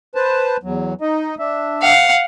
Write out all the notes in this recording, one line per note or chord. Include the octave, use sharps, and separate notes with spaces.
B4 C5 A5
E2 F#3
D#4 D#5
D4 E5
F5 F#5